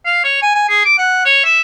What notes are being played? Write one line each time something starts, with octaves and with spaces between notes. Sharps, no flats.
F5
C#5
G#5
G#5
G#4
D6
F#5
C#5
E5